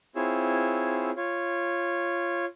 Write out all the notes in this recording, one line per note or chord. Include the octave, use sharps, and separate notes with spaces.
C4 E4 F4 G#4 C#5 E6
F4 C#5